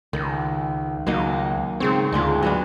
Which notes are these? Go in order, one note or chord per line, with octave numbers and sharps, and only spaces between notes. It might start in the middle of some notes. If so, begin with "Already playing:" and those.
C#2 D#3
C#2 F#3 A#3 D#4
G#2 C#3 C4 C#5
D2 G#3 D4 F4
F#3 B3 D4